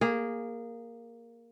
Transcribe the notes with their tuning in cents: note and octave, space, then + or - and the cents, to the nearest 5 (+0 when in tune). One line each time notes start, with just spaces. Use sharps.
A#3 +0 G#4 -15